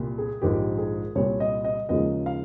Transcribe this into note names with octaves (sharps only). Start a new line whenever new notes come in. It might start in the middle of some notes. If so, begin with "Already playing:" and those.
Already playing: C2 A#2 G3
G#4
A#1 G#2 D#3 G#3 G4
G#4
C2 A#2 G3 C#5
D#5
D#5
D#2 C#3 F3 G#3 D#5
F5